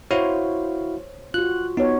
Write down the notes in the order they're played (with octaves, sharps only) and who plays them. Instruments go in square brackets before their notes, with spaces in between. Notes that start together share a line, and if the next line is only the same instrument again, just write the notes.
[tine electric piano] E4 F#4 F5 [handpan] C5 C#5
[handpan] F4 F#4 [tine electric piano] F#6
[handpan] B3 F#4 C#5 [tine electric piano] D#4